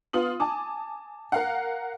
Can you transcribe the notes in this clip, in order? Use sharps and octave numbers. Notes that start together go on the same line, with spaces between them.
B3 F4 D#6 F#7
G#5 A5 D6
A#4 F5 F#5